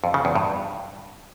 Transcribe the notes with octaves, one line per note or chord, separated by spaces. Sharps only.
F2
C#3
E2
G2